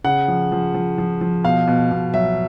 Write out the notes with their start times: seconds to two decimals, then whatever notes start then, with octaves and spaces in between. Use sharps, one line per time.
0.04 C#3 F#5
0.28 F3
0.52 F3
0.74 F3
0.98 F3
1.21 F3
1.44 B2 F5
1.67 B2
1.91 B2
2.14 F#3 E5